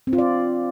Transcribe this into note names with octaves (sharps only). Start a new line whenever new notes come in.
C4
F4
D5